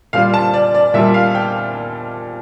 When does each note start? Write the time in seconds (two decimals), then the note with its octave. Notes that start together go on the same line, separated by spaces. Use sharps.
0.13 A#2 G3 A#3 F4 F5
0.34 A5
0.54 D5
0.75 D5
0.94 A#2 G3 A#3 F4 E5
1.14 F5
1.35 G5